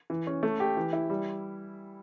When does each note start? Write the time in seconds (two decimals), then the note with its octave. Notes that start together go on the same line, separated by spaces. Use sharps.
0.10 E3
0.27 C#4
0.43 A3
0.60 G4
0.77 E3
0.93 E4
1.10 G3